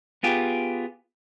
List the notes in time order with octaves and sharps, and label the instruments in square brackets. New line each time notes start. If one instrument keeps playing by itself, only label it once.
[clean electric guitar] B3 F4 G4 G#4